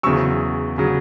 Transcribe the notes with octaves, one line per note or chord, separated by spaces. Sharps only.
E2 C#3 F#3 C#6 E6
C#3 F#3